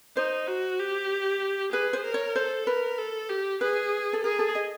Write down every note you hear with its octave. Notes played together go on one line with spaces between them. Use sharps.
D#4 C5
F#4
G4
G#4 B4
C5
A#4
C#5
A4 C5
A#4 B4
A4
G4
G#4 B4
A4
G#4 A#4
A4
D#5